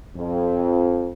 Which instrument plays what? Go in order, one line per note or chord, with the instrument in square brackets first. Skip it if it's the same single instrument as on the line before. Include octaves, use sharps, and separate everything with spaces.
[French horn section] F2